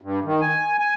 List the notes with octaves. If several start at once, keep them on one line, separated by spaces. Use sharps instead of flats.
G2
D#3
G#5
G#5